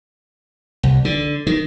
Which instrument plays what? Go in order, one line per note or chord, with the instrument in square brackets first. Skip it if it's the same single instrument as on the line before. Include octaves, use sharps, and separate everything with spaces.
[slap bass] C2
D3
D#3